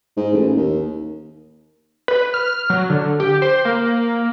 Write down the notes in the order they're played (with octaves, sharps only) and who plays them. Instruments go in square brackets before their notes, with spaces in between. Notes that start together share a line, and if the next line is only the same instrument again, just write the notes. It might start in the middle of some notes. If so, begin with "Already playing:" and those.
[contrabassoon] G#2
A1
D#2
[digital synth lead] B4
F6
F#3
D3
G4
C5
A#3